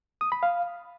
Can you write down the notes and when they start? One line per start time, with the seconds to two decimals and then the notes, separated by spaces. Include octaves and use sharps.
0.21 D#6
0.32 B5
0.43 F5